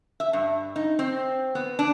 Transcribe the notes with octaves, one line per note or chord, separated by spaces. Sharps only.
E5
G2
D#4
C4
B3
D4